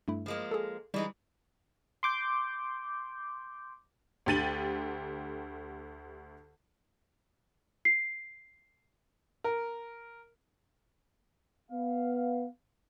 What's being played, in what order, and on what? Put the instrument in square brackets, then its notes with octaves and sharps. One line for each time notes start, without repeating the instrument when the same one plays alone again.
[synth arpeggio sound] G2 A3 E4
[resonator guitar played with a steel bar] F3 G#3 A#3
[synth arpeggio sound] G#4 A4
[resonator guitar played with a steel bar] E3 G#3 D#4 [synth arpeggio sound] G3
[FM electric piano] C6 D6 G6
[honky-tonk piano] D2 D3 G4 A6 D#7 F#7
[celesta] C7
[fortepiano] A#4
[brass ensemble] B3 F5